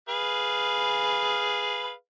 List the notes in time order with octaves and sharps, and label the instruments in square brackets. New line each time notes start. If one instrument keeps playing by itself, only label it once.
[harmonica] G#4 B4 F5